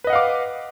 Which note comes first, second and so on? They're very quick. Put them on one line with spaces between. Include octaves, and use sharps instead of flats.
B4 D#5 F#5 F5 D6